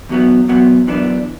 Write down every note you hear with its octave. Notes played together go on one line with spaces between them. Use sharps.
E2 B2 F#3 B3
E2 B2 F#3 B3
F#2 E3 B3 D4